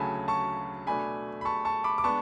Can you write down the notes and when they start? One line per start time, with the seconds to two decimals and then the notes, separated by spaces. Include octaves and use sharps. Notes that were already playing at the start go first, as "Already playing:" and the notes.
Already playing: D2 C#3 F#3 A3 G#5 A5 B5
0.28 A5 C#6
0.87 B2 A3 D4 G#5 B5
1.41 B5
1.45 A5 C#6
1.65 A5 C#6
1.84 B5 D6
1.98 D6
2.04 G#3 B3 D4 A5 C#6